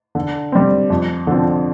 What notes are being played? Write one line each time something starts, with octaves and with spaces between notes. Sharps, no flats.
D3
G3 C4
F2
D3 F3 C4